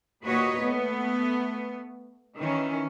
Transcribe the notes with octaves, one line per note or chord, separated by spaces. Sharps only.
D#2 A#2 F#4 B4 C#5 D#5
A3 B3
D#3 E3 C#4